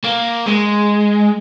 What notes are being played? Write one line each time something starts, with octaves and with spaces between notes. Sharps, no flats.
A#3
G#3